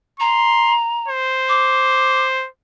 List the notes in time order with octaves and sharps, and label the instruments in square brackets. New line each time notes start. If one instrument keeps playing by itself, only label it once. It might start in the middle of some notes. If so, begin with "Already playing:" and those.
[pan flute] A#5 [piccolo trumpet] C6
[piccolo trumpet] C5
[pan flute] D6